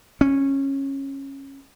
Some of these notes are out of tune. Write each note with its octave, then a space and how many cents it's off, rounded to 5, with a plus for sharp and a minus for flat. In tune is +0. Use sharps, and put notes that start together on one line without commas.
C#4 -15